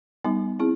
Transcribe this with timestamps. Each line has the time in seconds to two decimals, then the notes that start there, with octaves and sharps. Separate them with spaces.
0.25 G3 B3 D#4
0.59 C4 E4 G#4